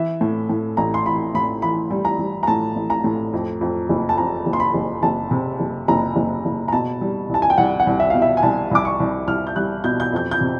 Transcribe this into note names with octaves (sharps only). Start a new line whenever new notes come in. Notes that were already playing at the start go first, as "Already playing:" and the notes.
Already playing: E3 E5
A2
A2
A1 A#5
C6
E3 B5
A2 B5
E3 B5
G3
A#5
G3
A#5
A2 A5
A1
A#5
A2
F2
F2
F#1
A5
F2 A#5
F#1
C6
B5
F#1
F#1 A5
C3
F#1
F#1 A#5
F#1
F#1
A#5
B2 A5
G3
C2 A5
G#5
G5
C2 F#5
F#5
C2
E5
B2 F5
E5
G#5
C2 A5
C2 D6
C#6
C2
C2 F6
G6
G3 F#6
B2 G6
G6
F2 G6
G6
C3